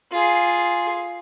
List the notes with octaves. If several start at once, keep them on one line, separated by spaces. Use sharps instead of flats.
F4 G#4